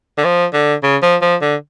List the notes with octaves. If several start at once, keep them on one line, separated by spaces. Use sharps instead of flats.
D3
F3
D3
C#3
F3
F3
D3